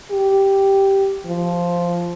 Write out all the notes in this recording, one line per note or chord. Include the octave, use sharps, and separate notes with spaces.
G4
F3